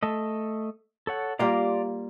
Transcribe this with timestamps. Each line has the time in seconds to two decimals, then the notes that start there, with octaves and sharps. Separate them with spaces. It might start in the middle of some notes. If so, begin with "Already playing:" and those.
0.03 A3 A4 D#5
1.07 A4 C#5 F#5
1.39 G3 A#3 F4 D5 A#5 C6